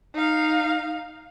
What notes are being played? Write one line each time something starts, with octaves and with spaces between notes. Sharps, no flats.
D#4 F5